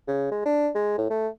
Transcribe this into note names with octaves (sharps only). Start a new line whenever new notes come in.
C#3
G#3
D4
G#3
A2
A3